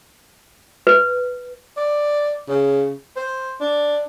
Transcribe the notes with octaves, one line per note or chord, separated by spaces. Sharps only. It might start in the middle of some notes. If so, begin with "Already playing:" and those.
B4
D5
C#3
C5
D4